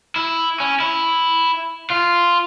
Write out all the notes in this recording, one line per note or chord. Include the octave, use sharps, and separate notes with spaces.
E4
C#4
E4
F4